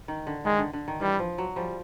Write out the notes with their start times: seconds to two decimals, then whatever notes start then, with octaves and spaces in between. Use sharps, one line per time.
0.08 D#3
0.27 D3
0.45 D#3 G#3
0.59 D3
0.73 D3
0.88 D#3
1.01 E3 G3
1.19 F3
1.38 F#3
1.56 F3 G3